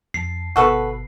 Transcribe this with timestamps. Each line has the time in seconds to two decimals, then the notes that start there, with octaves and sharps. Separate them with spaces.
0.14 F2 A5 C7
0.56 G1 B2 F#4 A4 B4